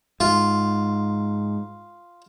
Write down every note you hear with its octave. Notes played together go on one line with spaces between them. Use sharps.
G#2 F4